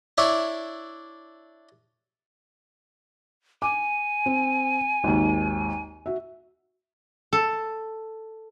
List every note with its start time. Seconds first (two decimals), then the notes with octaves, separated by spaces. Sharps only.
0.18 D4 E4 C#5 D5 E5
3.62 G#5 D6
4.26 C4
5.04 G#1 D#2
6.06 F#4 E5
7.33 A4